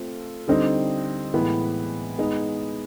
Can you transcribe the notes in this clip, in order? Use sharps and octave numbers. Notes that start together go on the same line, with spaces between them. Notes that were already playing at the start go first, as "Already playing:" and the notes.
Already playing: A3 C4 F4 A4
D3 G3 C4 D#4
A2 E3 G#3 B3
G#3 B3 D#4